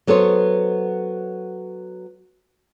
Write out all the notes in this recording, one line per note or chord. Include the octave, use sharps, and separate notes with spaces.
F#3 B3 A4 C5 C#5